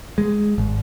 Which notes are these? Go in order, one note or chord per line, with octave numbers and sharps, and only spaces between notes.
G#3
G#1